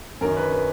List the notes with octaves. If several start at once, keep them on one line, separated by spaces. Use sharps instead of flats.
F#2 D#3 A#4
B4
B4